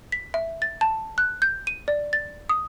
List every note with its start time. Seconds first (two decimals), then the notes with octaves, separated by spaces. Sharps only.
0.12 B6
0.34 E5
0.62 A6
0.81 A5
1.18 F#6
1.42 G6
1.67 D#7
1.88 D5
2.13 A6
2.49 D#6